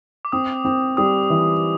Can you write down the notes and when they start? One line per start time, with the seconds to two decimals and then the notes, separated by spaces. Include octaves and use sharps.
0.25 D6
0.32 C4 D#6
0.65 C4
0.97 G3 D#6
1.30 E3